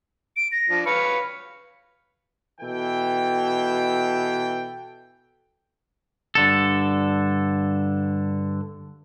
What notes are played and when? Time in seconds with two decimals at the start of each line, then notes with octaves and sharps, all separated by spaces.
0.37 D7
0.52 A#6
0.69 F3 D4
0.86 B4 C#5 F5 C#7
2.61 B2 E3 A4 G5
6.35 G2 D3 A4